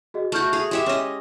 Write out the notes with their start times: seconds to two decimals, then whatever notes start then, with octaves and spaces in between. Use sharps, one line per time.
0.14 F#4 G#4 D#5
0.32 A3 F#4 C#6 F6 G6
0.53 G#4 F7
0.71 G#3 G4 E5
0.86 C#4 D#5